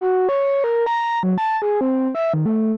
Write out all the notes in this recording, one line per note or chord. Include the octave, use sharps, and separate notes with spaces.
F#4
C#5
A#4
A#5
F#3
A5
G#4
C4
E5
D#3
A3